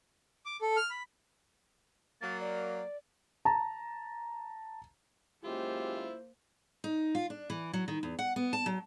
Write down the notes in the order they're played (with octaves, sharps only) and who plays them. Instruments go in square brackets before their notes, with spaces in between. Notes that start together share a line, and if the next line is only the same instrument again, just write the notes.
[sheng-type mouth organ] D6
A4
F6
B5
[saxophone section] F#3 A#3 [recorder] A6
[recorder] D5
[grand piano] A5 A#5
[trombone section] F#2 G#3 G4 [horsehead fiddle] A#3 C5 [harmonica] E4 F4
[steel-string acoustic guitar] D#4
F4
D4
E3
F#3
D#3
E2
F#5
B3
A5
F#3